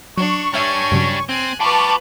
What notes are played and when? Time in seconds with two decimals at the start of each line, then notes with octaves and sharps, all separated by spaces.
0.17 F#3 D4 C#6
0.54 G3 D4 C#5 E5 G#5 F6
0.91 G2 C#3 F#3
1.29 C4 G#5 F#6
1.60 F4 B4 G5 A5 B5 C#6 D6